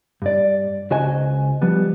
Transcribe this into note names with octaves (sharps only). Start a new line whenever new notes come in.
G2 D5
C#2 F#4 C5 D#5 G#5
F3 G3 B3